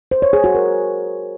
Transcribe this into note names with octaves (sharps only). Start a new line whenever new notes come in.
C5
C#5
G#4
F#4
A#4